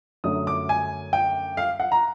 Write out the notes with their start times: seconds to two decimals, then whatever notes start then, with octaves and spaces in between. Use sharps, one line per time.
0.24 F#2 D3 F#3 A3 D#6
0.47 D6
0.69 G#5
1.13 G5
1.57 F5
1.80 F#5
1.92 A#5